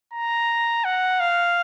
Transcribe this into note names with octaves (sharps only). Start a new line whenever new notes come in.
A#5
F#5
F5